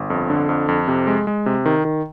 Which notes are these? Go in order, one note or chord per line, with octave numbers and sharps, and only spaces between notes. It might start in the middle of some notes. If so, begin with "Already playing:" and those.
Already playing: G1
F2
D3
F2
F2
C3
G#3
G#3
C3
D#3
D#3